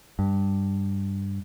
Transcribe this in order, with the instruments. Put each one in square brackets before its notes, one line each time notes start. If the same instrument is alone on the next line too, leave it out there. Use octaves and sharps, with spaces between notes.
[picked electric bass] G2